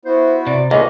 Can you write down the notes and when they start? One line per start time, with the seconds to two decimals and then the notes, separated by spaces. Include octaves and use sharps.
0.05 B3 E4 F#4 C5
0.47 C3 D5
0.71 C#2 A2 D3 A#3 F#4 A4 D#5